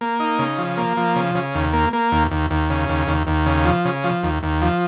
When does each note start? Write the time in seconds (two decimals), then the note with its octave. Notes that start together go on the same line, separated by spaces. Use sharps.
0.01 A#3
0.20 D#4
0.39 C#3
0.58 F3
0.77 A#3
0.97 F3
1.16 C#3
1.35 C#3
1.55 D#2
1.73 A#3
1.93 A#3
2.12 D#2
2.31 D#2
2.51 D#2
2.70 C#3
2.89 D#2
3.07 D#2
3.27 D#2
3.46 C#3
3.65 F3
3.85 C#3
4.04 F3
4.23 D#2
4.43 D#2
4.62 F3